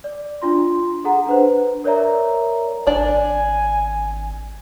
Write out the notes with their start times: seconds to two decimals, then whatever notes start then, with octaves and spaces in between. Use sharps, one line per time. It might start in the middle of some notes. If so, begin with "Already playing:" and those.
0.04 D5
0.42 D4 F4 C6
1.04 G#4 A4 F#5 A#5
1.26 D4 B4 C5
1.84 A#4 C#5 D5 E5 A#5
2.87 G#1 D4 D5 G#5